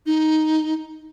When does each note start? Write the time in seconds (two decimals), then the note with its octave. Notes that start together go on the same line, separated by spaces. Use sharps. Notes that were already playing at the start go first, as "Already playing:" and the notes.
0.06 D#4